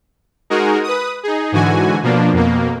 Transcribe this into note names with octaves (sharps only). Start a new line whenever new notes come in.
G#3 D#4 F#4 G#4 A#4
B4 D#6
D#4 G#4
G#2 D3 E3 F#4 G#5
B2 F3 A#3 D4
F2 B2 A#3